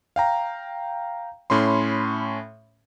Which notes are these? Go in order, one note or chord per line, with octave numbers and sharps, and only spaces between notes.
F5 G5 A#5
A2 C#4 B5 C6